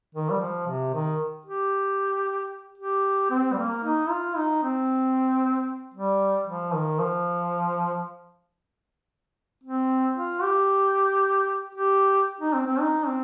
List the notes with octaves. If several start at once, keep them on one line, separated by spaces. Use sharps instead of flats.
D#3
G3
F3
C3
D#3
G4
G4
C4
G3
A#3
D#4
F4
D#4
C4
G3
F3
D#3
F3
C4
F4
G4
G4
D#4
C4
C4
D#4
C4